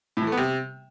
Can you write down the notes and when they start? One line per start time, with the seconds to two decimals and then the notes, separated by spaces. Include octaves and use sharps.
0.17 A2
0.22 E3
0.27 A3
0.32 B3
0.37 C3